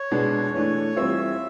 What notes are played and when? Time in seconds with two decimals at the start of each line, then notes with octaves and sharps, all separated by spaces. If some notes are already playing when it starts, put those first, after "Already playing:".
Already playing: C#5
0.11 B2 G#3 B3 D4
0.54 E3 A3 D4 C#5
0.96 E3 G3 C4 F4 E5